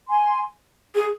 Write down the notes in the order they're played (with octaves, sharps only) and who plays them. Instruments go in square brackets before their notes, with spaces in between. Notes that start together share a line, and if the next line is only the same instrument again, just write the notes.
[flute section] G#5 C6
[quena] G#4